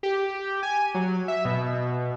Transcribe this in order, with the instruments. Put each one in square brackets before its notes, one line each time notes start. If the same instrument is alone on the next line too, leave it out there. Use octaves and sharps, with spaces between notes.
[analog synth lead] G4
G#5
F#3
E5
B2